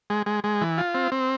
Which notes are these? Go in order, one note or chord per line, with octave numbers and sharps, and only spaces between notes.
G#3
G#3
G#3
E3
F4
C4
C4